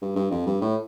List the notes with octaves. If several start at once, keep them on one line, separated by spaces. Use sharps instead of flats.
G2
G2
F2
G2
A2